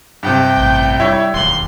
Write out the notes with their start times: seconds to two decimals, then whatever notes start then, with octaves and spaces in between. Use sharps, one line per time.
0.23 G2 C3 G5
0.57 A1
1.00 G3 E4 C#5 E5
1.34 E1 D#2 C6 F#7